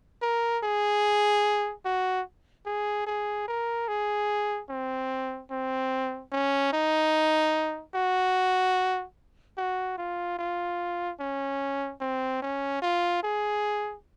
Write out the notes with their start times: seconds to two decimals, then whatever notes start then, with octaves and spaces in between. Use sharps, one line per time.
0.22 A#4
0.64 G#4
1.85 F#4
2.66 G#4
3.07 G#4
3.48 A#4
3.88 G#4
4.69 C4
5.51 C4
6.32 C#4
6.73 D#4
7.95 F#4
9.57 F#4
9.98 F4
10.39 F4
11.20 C#4
12.00 C4
12.42 C#4
12.82 F4
13.23 G#4